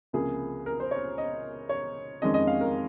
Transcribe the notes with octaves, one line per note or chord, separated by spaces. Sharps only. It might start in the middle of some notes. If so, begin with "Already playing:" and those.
C#2 C3 F3 A#3 G#4
A#4
C5
C#5
D#5
C#5
F2 D#3 G#3 C#4 D#5
D#5
F5
A#4